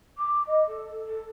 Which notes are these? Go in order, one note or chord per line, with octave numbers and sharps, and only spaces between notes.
D6
D#5
A4
A4